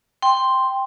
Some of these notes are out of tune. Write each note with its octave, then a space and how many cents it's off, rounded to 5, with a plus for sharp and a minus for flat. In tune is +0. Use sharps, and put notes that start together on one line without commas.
G5 +0 C6 +0